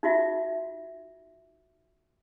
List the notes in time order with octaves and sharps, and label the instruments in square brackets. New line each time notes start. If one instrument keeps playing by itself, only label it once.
[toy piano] D#4 F4 F#4 E5